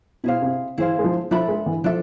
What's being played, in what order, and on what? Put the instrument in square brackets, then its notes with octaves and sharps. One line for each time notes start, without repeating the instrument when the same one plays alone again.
[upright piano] B2 [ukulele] E4 G#4 C5 F5
[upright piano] C3
[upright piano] E3 [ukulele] E4 G#4 C5 F5
[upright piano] G#3
F3
[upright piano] F3 [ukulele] D4 A4 E5 B5
[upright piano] G#3
E3
[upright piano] F3 [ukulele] D4 A4 E5